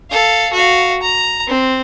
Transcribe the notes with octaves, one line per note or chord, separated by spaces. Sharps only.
A4 F5
F#4 F5
A#5
C4